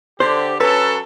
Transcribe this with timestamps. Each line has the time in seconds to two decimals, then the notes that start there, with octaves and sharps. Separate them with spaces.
0.20 D3 G4 C5
0.60 F#3 C#4 A4 B4